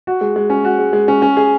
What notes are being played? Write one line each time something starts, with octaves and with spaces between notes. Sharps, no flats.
F#4
G#3
G#3
C#4
F#4
G#3
G#3
C#4
C#4
G#4